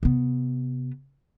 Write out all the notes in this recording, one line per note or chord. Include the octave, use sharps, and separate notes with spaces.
C3 B3